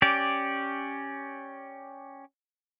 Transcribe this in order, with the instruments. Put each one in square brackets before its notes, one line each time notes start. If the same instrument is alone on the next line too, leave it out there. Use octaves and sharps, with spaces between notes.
[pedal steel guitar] C#4 G4 D5